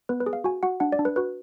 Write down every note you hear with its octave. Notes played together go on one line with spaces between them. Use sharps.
B3 B4
B4
G#4
F5
F#4 G#5
F#4 F#5
D4 F#5
D5
D4
B4
F#4 B4